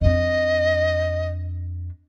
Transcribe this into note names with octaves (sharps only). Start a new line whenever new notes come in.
F2 D4 D#5